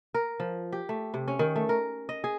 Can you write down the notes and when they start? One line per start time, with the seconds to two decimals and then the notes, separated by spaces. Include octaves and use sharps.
0.14 A#4
0.40 F3
0.72 G4
0.89 A3
1.14 C3
1.28 C#4
1.39 D#3
1.56 A3
1.69 A#4
2.09 D#5
2.24 G#4